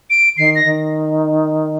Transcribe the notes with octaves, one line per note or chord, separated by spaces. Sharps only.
D7
D#3 C7
A#6
D#3